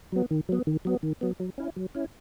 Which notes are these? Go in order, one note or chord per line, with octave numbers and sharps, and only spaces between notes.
F#3 B3
D#3
F#3 B3
D#3
F#3 B3
D#3
F#3 B3
F#3
C#4 E4
F#3
C#4 E4